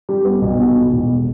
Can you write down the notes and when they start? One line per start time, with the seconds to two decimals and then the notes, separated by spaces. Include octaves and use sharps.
0.09 G3
0.25 B3
0.42 B1
0.59 B2
0.75 B1
0.93 E1